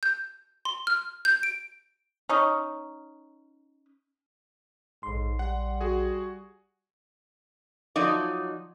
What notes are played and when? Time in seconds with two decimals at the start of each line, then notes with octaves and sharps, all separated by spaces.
0.03 G6
0.65 C6
0.87 F6
1.25 G6
1.43 D7
2.29 C#4 D#4
5.03 A#1 G#2 C6
5.39 G3 F#5
5.81 F#4 G#4
7.96 F3 F#3 D#4 D5